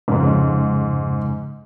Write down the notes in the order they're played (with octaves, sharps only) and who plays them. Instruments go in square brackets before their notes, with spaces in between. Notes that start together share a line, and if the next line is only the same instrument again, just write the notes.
[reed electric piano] F2 C#3 [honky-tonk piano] G#2